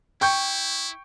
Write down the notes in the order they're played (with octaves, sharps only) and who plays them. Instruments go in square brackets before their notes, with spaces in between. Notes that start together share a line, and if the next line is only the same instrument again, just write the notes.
[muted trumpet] E4 [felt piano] G5 C#6 G6